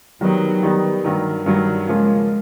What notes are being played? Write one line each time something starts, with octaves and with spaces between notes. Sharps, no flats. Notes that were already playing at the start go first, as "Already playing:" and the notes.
D#3 F#3 G3 B3 D#4
D#3 G3 B3 D#4
G2 D#3 F#3
G2 D#3 F#3 G3
C#3 F3 G#3 A#3 C#4 F4